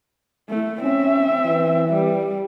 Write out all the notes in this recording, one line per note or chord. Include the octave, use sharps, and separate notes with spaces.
A3 E4
C4 C#4 E5
E3
G3